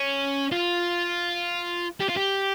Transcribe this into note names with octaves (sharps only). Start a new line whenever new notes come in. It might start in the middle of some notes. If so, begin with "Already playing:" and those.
Already playing: C#4
F4
G4
F4
G4